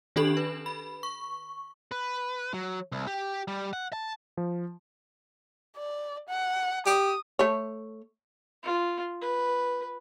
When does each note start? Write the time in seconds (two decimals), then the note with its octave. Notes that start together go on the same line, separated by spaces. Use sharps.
0.16 D#3 D4 G4 A4 B5 F#7
0.37 B4
0.66 B5
1.03 C#6
1.92 B4
2.54 F#3
2.92 C2
3.07 G4
3.48 G3
3.73 F#5
3.93 A5
4.37 F3
5.77 D5
6.29 F#5
6.86 G4 D#6
7.39 A3 C#5
8.63 F4
9.21 B4